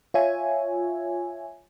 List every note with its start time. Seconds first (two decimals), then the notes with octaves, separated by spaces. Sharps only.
0.14 F4 C#5 E5 G#5